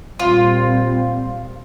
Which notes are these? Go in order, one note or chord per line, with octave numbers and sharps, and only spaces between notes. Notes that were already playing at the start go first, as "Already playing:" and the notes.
A#2 G3 C4 F4